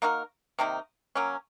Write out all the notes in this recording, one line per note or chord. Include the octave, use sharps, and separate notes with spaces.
A#3 D#4 F#4 A#4
C3 D#3 A#3 D#4
F#3 A#3 C#4